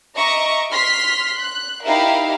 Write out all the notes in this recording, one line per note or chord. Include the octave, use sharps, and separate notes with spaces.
D#5 E5 A#5 C#6 D6
C6 F6 B6
F#6
D#4 E4 G4 A#4 E5 F5